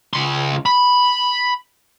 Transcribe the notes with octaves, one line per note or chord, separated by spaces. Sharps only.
C#2 C6
B5